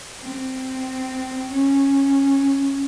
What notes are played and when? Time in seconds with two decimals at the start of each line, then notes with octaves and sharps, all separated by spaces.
0.21 C4
1.51 C#4